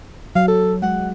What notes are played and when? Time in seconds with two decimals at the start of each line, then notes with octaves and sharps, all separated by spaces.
0.36 F#3 F5
0.48 A4
0.82 G#3 F#5